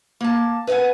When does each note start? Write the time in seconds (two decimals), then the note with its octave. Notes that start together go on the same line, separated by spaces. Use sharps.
0.21 A#3 A5
0.67 B4 D#5 F5 F#5 G#5